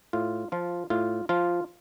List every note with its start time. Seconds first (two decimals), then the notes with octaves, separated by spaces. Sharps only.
0.13 A2 F4
0.52 F3 F4
0.90 A2 F4
1.29 F3 F4